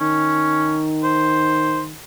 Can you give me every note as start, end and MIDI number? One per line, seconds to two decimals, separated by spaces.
0.01 1.98 51
0.01 0.87 61
1.03 1.82 72